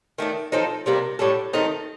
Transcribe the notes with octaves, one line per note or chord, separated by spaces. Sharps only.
D#3 A3 D4
F3 C4 D#4 A4
C3 G3 A#3 D4
A2 G3 D4 A4
D#3 A3 C4 D#4